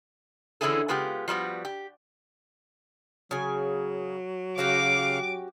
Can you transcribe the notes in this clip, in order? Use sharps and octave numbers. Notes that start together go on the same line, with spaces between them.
D3 E3 C#4 E4 G#4 A4
C#3 G#3 B3 F4 G4
F3 G3 B3 F#4
G4
C#3 F#3 G#5
C#3 C#4 F#4 G4 F5 D6